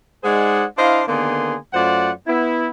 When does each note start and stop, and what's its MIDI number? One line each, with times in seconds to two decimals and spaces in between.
0.24 0.64 56
0.24 0.64 63
0.24 0.64 68
0.24 0.64 72
0.24 0.64 74
0.24 0.64 78
0.78 1.02 62
0.78 1.02 64
0.78 1.02 72
0.78 1.02 75
0.78 1.02 77
1.08 1.55 50
1.08 1.55 51
1.08 1.55 58
1.08 1.55 59
1.08 1.55 68
1.08 1.55 84
1.73 2.10 42
1.73 2.10 57
1.73 2.10 65
1.73 2.10 72
1.73 2.10 74
1.73 2.10 78
2.26 2.68 59
2.26 2.68 64